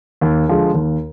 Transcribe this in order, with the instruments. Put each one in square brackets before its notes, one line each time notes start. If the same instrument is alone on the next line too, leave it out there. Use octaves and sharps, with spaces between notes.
[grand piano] D#2
D3 F3 G#3
D#2